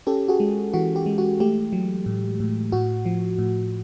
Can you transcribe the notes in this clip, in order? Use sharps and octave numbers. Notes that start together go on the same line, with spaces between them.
C#4 G4 A4
F#4 G#4
G#3
E3 F#4
G4
G#3
F#4
A3 G4
F#3
A2
A2
A2 F#4
F3
A2